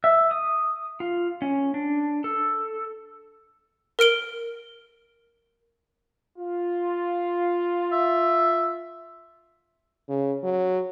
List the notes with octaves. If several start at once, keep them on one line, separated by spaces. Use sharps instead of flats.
E5
D#6
F4
C#4
D4
A4
A#4 F6 D7 G7
F4
E5
C#3
F#3